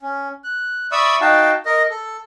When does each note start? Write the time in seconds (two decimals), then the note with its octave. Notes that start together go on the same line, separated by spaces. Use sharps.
0.02 C#4
0.44 F#6
0.92 D5 E5 B5 C#6 D#6 E6
1.21 D#4 F#4 F5 G5 A5
1.66 A#4 D#5
1.90 A4